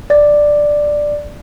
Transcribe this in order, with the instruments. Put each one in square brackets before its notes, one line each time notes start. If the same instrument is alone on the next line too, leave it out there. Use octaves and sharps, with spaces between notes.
[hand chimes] D5 A6